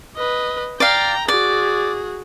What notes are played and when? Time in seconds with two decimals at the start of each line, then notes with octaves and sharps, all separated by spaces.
0.16 B4 D#5
0.80 D5 F5 G5 A#5
1.28 F#4 G#4 D5